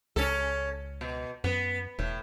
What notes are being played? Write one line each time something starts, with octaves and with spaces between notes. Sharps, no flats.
C#2 C#4 A4
B2
F#2 B3
E1 A2